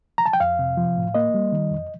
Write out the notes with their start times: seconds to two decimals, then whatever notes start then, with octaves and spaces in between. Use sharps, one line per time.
0.18 A#5
0.26 A5
0.33 G5
0.40 F2 F5
0.59 C3
0.77 F3
0.97 A2
1.15 A#3 D#5
1.34 G3
1.52 D#3
1.71 F2